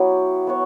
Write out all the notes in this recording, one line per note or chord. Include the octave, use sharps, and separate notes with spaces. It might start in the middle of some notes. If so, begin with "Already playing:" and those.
Already playing: F#3 B3 E4 G4
B3 F#4 C#5